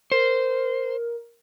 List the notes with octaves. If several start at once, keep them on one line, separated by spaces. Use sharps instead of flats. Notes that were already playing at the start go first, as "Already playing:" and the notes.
A#4 C5